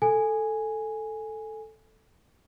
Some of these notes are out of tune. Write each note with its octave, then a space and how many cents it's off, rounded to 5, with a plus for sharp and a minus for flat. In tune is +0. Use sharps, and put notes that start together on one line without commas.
A4 +0 G#5 +0